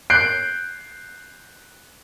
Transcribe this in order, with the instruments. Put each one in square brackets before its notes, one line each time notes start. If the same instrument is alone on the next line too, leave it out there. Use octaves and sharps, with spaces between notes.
[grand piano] F#6 G6 C7 D7